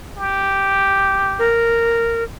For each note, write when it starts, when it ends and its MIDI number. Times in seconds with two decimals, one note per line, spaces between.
0.17 1.52 67
1.39 2.24 70